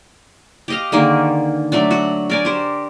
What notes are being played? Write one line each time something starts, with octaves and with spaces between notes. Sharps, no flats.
G4 D#5 F5
D3 D#3 A#3 G#4
F#3 A3 D4
F#4
A#4 D5 G#5
G4 C5